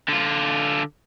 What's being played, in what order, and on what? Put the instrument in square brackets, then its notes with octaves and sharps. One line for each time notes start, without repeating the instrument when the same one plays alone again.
[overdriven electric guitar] D3 F4